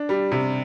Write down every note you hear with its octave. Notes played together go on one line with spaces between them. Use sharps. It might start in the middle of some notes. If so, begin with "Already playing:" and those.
Already playing: D4
G3
C3